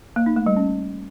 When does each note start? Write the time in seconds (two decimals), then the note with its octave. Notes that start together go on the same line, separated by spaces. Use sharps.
0.16 A#3
0.26 D#4
0.36 A3
0.46 G3
0.57 C#4